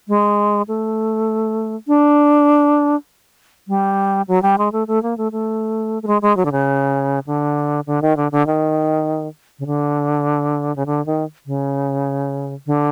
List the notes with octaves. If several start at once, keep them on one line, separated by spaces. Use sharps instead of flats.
G#3
A3
D4
G3
F#3
G3
G#3
A3
A3
A#3
A3
A3
A3
G#3
G#3
F#3
D3
C#3
D3
D3
D#3
D3
D3
D#3
C#3
D3
C#3
D3
D#3
C#3
D3